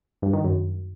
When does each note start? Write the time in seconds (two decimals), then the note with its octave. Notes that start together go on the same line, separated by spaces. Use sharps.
0.22 G2
0.33 D#3
0.44 F#2